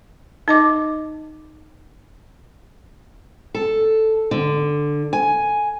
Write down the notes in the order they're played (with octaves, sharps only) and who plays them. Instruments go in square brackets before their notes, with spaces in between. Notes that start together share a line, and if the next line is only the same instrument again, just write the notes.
[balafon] D#4 D#5 D6
[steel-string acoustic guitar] A4
D3
G#5